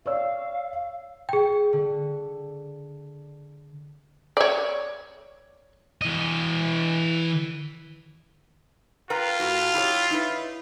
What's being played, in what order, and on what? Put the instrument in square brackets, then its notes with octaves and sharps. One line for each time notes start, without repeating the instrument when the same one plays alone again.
[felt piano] C#5 D5 E6 [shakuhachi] F5
[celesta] G#4 G5
[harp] D3
[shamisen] C#5 D5
[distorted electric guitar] E3 D#5
[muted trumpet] F4 [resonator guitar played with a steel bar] A#4 B4 G5
[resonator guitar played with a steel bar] A2 F#4
E4 G4 C#5
D#4 E4 B4